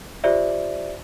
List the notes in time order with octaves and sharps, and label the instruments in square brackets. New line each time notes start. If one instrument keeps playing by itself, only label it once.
[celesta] F4 G4 C5 D5 E5